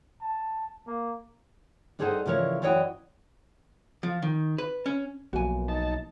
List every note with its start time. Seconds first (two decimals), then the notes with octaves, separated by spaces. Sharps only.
0.22 A5
0.87 A#3
1.99 G2 D#4 G#4 A4 C5 F#5
2.26 C#3 E3 F3 A#4 C#5
2.62 F#2 E3 C#5 D#5 F#5 G5
4.03 F3
4.22 D#3
4.58 B4
4.86 C#4
5.33 B1 F3 A#3 B3 F#4 G#5
5.68 D#4 A5